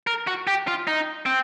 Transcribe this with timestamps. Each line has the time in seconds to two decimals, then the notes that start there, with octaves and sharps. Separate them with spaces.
0.07 A#4
0.27 F#4
0.47 G4
0.68 F4
0.87 D#4
1.26 C4